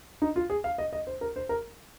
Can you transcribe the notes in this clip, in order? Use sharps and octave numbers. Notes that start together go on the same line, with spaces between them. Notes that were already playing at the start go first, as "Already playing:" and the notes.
D#4
F4
G#4
F5
D#5
D#5
C5
A#4
C5
A#4